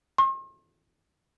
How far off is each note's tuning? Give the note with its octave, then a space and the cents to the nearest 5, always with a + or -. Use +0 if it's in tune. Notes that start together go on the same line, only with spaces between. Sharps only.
C6 +45